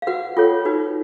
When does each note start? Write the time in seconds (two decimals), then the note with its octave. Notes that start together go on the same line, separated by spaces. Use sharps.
0.02 F5
0.07 F#4 B4 F#5
0.37 F4 A4 C#5 G5
0.65 D#4 F#4 B4